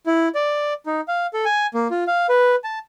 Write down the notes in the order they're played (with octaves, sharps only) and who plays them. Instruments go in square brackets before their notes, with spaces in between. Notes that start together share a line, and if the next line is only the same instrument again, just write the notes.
[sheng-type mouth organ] E4
D5
D#4
F5
A4
G#5
A#3
F4
F5
B4
A5